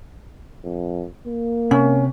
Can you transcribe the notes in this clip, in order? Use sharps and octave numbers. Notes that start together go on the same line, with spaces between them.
F2
A#3
C3 C#4